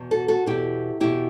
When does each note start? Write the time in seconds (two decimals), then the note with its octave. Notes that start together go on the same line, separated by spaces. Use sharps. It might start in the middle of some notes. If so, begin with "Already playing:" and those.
Already playing: E2 B2
0.11 F#4 A4
0.28 F#4 A4
0.46 E2 B2 E4 G4
1.00 E2 B2 E4 G4